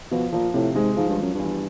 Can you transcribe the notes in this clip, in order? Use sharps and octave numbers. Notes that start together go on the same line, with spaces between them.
B2 F3
A#2 F3
A2 C3
G#2 G#3
G#2 F3
G2
F#2 F3
E2 G2